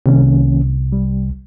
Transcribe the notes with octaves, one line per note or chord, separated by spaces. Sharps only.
C2 D#3 A#3 C#4
G3